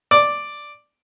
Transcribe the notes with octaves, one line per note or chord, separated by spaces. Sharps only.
D5